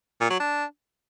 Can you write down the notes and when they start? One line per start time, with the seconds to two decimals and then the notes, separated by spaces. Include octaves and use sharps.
0.20 A#2
0.30 F#3
0.40 D4